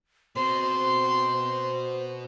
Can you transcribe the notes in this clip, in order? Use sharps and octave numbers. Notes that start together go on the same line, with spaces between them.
B2 C4 C5 C6